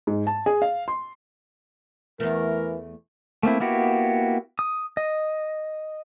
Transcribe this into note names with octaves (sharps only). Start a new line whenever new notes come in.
G#2
A5
G#4
F5
C6
E2 E3 A3 A#4
A3 A#3 C4 E4
A#3 B3 E4 F#4 G4
D#6
D#5